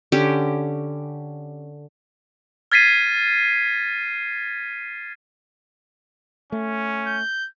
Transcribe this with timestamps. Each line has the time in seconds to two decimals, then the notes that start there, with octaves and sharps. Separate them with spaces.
0.12 D3 C#4 G4
2.72 F6 G#6 A6 B6 C7 D#7
6.52 A3 C#4
7.07 G6